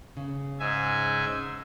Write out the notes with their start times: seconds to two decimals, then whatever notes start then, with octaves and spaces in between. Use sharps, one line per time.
0.17 C#3
0.59 G#2 E5 G#5